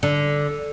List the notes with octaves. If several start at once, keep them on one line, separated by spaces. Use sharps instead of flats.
D3